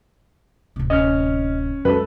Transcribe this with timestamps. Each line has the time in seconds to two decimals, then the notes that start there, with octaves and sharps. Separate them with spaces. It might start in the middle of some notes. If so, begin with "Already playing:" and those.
0.76 D1 C3
0.90 C#4 D#5 F6
1.85 F#2 G#3 A4 B4